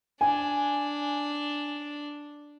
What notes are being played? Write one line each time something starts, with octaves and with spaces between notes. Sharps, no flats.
D4 G#5